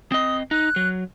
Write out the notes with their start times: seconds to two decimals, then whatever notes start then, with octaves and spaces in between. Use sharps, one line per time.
0.12 C4 D#5 D#6
0.51 D#4 F#6
0.76 F#3